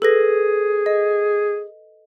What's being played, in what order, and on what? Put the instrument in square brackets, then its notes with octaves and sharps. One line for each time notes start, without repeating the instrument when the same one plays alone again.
[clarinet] G#4 [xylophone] A4 B4 A#6
[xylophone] D#5